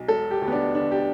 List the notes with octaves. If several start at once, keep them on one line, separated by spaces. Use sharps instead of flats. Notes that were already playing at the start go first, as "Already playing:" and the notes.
Already playing: B1
E1 A4
G4
D2
B3
D4
D3 D4
G4